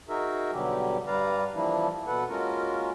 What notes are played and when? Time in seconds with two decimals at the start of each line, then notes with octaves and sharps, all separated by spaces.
0.09 D#4 F#4 G#4 A#4 E5
0.53 B2 D3 F#3 G3 G4
1.07 G2 G3 B4 D5 F5 A#5
1.55 E3 F3 G3 A#3 D4 E4
2.07 B2 A4 B4 F#5
2.29 G#3 A#3 C#4 F4 F#4 A#4